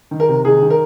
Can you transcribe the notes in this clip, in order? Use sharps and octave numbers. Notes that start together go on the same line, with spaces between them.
D#3
A#4
C3
D#3 G#4
D#3
A#4